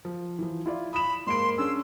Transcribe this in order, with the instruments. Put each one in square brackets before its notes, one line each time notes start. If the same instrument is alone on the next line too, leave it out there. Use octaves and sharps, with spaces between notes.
[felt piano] F3
E3 F3
E4 F4 D5
[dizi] B5 [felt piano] D#6 E7
[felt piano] G#2 A#3 D7 [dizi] C6
[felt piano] C#4 D4 G#4 [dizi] E6